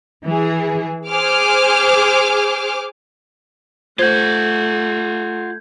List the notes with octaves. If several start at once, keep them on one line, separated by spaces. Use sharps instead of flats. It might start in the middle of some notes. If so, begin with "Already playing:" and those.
E3 G#4
G#4 C5 D6 F6
A3 F4 C5 F#5 G6 G#6